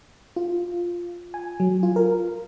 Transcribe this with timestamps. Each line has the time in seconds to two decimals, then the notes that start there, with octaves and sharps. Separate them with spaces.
0.36 F4
1.34 G#5
1.60 F#3
1.83 F4
1.96 A#4